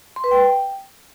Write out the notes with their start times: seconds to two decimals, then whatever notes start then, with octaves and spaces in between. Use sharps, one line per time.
0.16 C6
0.24 B4
0.31 G5